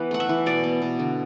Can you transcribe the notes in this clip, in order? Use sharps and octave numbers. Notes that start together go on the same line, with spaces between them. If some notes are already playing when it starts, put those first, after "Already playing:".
Already playing: E3 B3 B4
A3 F#5
E5
E3
B2 D5
B3
B2
D3